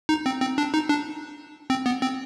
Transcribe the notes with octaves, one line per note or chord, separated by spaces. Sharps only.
D#4
C4
C4
D4
D#4
D4
C4
B3
C4